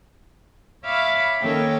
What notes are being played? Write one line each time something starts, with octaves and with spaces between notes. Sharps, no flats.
C#5 E5 F5 B5 D6
D#3 A#3 C#4 A4 C#5 G5